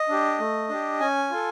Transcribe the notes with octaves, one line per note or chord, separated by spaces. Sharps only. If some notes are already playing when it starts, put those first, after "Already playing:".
Already playing: D#5
D4 G4
A3
D4 G4
C#4 G#5
F4 A4